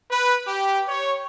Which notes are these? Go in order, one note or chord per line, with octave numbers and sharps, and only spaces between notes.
B4
G4
C#5